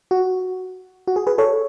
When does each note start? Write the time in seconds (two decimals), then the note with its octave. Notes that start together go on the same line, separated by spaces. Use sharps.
0.11 F#4
1.07 F#4
1.16 G#4
1.27 G#4 B4
1.38 A4 C#5